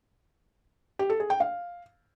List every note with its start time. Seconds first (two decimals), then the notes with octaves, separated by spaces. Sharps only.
0.99 G4
1.10 A4
1.20 G#4
1.30 G5
1.40 F5